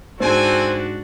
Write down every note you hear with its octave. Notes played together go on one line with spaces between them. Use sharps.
G#2 C4 D4 F#4 A4 C5 G#5